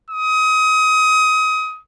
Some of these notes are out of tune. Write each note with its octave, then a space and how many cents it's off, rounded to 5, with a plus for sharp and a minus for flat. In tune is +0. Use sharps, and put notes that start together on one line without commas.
D#6 +25